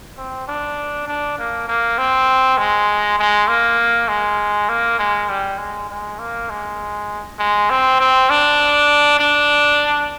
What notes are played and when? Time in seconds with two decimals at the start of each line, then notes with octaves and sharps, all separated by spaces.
0.18 C4
0.48 D4
1.08 D4
1.38 A#3
1.68 A#3
1.98 C4
2.58 G#3
3.19 G#3
3.48 A#3
4.08 G#3
4.69 A#3
4.99 G#3
5.29 G3
5.58 G#3
5.89 G#3
6.19 A#3
6.50 G#3
7.39 G#3
7.70 C4
8.00 C4
8.30 D4
9.20 D4